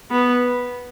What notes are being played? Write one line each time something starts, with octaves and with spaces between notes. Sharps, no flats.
B3